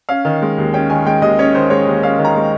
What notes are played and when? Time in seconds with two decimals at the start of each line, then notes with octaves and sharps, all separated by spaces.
0.09 C#4 F5
0.25 D#3
0.42 G#3
0.58 D#2
0.74 C#4 G5
0.90 D#3 G#5
1.06 G#3 G5
1.22 D#2 D#5
1.39 C#4 C#5
1.55 D#3 C5
1.70 G#3 C#5
1.87 D#2
2.02 C#4 F5
2.19 D#3
2.25 A#5
2.36 G#3